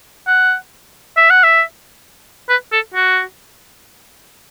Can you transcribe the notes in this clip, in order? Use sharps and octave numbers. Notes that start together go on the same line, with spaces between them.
F#5
E5
F#5
E5
B4
A4
F#4